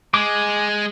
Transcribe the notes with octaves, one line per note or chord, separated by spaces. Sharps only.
G#3 G#4 D6